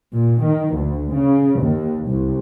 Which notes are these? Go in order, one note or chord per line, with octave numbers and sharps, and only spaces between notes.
A#2
D#3
D2
C#3
D#2
C2